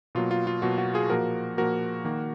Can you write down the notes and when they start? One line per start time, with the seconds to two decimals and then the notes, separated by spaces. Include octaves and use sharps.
0.15 B2 F#3 A#3 F4
0.31 F4
0.47 F4
0.62 B2 F#3 A#3 F#4
0.78 F#4
0.94 F4 G#4
1.09 A#2 F3 A#3 F#4 A#4
1.57 A#2 F3 A#3 F#4 A#4
2.04 D#3 A#3